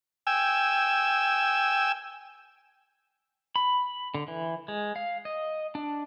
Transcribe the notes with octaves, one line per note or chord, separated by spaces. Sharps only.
G5 G#5 E6
B5
D3
E3
G#3
F5
D#5
D4